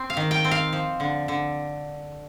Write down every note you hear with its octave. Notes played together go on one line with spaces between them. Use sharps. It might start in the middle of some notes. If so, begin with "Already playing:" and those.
Already playing: C4
F5
D#3
G5
C4
F5
F3
D3
D3